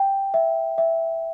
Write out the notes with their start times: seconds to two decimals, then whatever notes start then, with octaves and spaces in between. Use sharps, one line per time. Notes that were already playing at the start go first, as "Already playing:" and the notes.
Already playing: G5
0.34 E5
0.78 E5